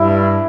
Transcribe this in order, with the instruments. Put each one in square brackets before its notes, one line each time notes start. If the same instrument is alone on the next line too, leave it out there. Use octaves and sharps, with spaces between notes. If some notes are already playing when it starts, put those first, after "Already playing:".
Already playing: [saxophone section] G2 [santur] E4